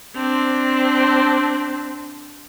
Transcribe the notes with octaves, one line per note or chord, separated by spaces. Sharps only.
C4 D4